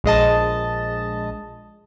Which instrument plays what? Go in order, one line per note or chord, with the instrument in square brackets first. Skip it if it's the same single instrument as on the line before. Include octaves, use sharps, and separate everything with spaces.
[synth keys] A#1 G#3 D#5 A5